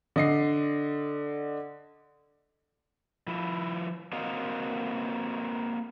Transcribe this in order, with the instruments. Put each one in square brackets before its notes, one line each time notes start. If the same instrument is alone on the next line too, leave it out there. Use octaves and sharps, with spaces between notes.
[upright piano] D3 D#5 C7
[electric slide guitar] F3 E4
A#3 C4 F#4 C#5 D#5 F5